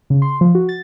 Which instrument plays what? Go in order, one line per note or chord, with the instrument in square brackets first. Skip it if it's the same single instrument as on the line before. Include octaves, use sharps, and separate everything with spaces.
[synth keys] C#3
C6
F3
F#4
A6